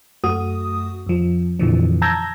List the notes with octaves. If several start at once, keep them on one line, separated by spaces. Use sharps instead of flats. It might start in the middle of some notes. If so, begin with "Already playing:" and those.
F#2 A3 F#4 D#6
F2 F3
F2 A#2 D3 E3 F3
A5 A#5 E6 G6 G#6 A#6